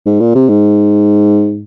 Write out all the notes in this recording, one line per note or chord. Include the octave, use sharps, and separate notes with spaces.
G#2
A#2
C3
G#2